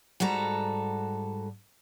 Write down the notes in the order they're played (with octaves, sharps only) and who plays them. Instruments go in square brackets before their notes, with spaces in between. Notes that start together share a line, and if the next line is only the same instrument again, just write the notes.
[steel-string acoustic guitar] G#2 G3 F#4 A4 A#5